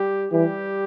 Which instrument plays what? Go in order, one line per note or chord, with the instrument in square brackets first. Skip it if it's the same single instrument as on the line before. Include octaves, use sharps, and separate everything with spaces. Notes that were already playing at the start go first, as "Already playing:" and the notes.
Already playing: [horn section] G3 G4
[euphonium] E3 [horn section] G3 G4